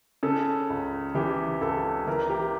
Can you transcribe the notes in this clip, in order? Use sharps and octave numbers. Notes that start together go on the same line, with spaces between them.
C#3 A4
C#2
E3 G4
C#2 A4
E3 A#4
G4